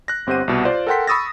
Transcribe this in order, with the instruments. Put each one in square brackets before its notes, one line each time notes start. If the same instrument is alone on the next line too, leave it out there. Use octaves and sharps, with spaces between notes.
[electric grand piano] F#6 A#6
G1 C4 G4 C5 F#5 D#7
C2 B2
F4 C5 D5
A4 A#4 F#5 G5 C6 B6
B5 C#6 D#6 E6 A6 A#6